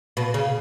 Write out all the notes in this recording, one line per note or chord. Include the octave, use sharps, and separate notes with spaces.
B2
C#3